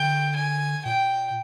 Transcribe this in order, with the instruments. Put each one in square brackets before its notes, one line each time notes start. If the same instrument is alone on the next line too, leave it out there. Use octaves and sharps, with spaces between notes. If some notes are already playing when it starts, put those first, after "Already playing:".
Already playing: [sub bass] D3 [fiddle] G5
[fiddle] G#5
[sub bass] A#2 [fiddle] G5